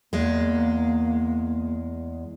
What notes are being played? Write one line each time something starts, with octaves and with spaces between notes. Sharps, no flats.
E2 G#3 A#3